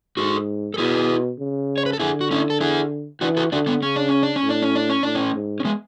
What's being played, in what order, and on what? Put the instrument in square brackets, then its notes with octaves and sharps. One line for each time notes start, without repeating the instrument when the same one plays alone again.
[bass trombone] G#2 [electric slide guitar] F#4 A4
[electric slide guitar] A4
[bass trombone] B2 [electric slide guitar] E4 G#4
[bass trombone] C#3
[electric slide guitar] C#5
B4
A4
[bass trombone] D3 [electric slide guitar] E4 G#4
[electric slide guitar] F#4
C#4 E4
A4
E4 G#4
[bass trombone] E3 [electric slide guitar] D4 F#4
[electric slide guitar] F#4 A4
[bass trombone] D3 [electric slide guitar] D4 F#4
[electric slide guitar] B3 D4
[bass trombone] C#3 [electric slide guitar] C#4
[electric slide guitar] D4
C#4
D4
C#4
[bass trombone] A2
[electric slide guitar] D4
C#4
D4
C#4
[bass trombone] A2 [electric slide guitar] D4
[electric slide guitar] A3 C#4
[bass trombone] G#2
[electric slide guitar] C#4
G#3 B3